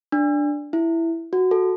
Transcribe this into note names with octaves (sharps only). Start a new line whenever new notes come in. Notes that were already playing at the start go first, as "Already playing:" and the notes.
D4
E4
F#4
A4